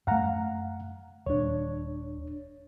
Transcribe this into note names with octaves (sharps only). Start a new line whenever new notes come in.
F#2 A3 F5 F#5 A#5
D#1 D4 C#5